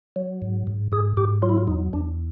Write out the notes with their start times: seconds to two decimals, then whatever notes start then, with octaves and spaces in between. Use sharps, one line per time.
0.16 F#3
0.42 G#2
0.67 G#2
0.92 G#2 G#4
1.17 G#2 G4
1.42 F#3 F4
1.49 E4
1.58 F4
1.67 E2 D#4
1.93 E2 D4